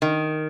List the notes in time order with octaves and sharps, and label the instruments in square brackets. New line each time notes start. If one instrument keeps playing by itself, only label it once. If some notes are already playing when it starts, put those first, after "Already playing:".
[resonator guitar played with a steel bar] D#3